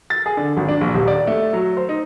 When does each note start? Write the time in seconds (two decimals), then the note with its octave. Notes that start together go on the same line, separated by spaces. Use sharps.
0.10 A6
0.26 G#4
0.37 D3
0.57 G#1
0.68 D4
0.81 A#1
0.94 D#1
1.08 D5
1.27 A3
1.53 F#3
1.77 C5
1.89 D#4